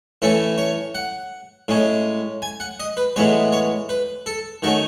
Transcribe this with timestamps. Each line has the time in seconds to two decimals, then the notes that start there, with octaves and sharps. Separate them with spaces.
0.22 A2 E3 A3 C#4 A4
0.58 C#5
0.95 F#5
1.68 A2 G#3 C#4
2.42 G#5
2.60 F#5
2.80 D#5
2.97 B4
3.16 A2 E3 G#3 B3 C#5
3.52 C#5
3.89 B4
4.26 A4
4.62 D#3 A3 C#4 F#4